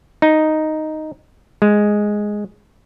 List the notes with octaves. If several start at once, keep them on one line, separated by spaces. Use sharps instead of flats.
D#4
G#3